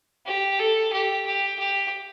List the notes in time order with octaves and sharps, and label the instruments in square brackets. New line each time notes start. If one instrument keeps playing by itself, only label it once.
[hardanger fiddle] G4
A4
G4
G4
G4